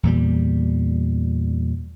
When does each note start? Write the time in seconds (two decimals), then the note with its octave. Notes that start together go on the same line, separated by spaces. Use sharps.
0.03 E2 A#2 G3